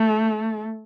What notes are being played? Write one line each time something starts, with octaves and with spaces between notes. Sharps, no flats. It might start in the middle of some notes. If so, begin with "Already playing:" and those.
Already playing: A3